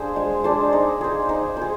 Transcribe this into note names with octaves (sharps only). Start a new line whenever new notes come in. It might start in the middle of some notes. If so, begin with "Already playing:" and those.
Already playing: D4 G#4 C5
G#3
D4 G#4 C5
D#4
G#4 C5
D#4
G#4 C5